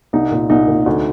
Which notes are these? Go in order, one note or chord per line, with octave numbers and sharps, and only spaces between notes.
C2 D#4
A#2
C2 D#4
A#2
D2